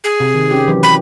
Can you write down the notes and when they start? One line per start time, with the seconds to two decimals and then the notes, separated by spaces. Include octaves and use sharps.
0.04 G#4
0.20 C3
0.35 D#3
0.51 C#4 G4
0.68 E3 F#3
0.83 E3 B5